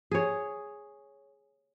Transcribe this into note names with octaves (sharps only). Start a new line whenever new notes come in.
G#4 C#5